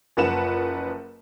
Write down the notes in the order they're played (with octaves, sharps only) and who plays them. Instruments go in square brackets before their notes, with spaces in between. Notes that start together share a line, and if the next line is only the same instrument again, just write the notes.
[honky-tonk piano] F#1 F3 B4 F#5 E7